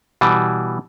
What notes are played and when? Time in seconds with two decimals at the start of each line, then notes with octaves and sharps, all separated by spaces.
0.21 B2 E3 G3